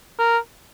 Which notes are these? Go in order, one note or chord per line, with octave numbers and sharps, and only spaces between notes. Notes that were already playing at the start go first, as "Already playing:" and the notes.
A#4